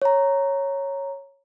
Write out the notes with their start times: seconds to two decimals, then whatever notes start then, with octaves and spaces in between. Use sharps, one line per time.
0.02 C#5 A#5